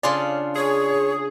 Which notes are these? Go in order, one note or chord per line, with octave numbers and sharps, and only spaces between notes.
C#3 D4 F4 D5 G#5 C6
G#4 C#5